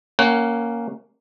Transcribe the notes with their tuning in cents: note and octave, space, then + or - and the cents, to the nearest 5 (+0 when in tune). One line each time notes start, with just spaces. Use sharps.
A#3 +0 C#4 +0 F#5 +25